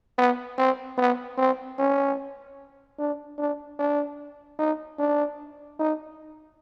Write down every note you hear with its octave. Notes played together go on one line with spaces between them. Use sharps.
B3
C4
B3
C4
C#4
D4
D4
D4
D#4
D4
D#4